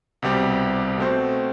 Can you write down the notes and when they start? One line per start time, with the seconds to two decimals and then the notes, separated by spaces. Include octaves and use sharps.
0.22 C2 B2 G3 C4 G4
0.98 B2 A3 C4 F#4 C5